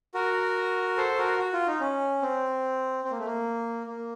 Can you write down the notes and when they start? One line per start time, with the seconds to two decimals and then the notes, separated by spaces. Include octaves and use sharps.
0.14 F#4 A#4
0.97 A4 C5
1.18 F#4 A#4
1.39 F#4
1.53 F4
1.67 D#4
1.80 C#4
2.22 C4
3.04 C4
3.11 A#3
3.19 A3
3.25 A#3
3.87 A#3